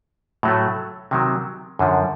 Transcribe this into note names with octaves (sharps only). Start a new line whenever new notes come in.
A2 F#3 A3
C3 D#3 F#3
F#2 D3 F3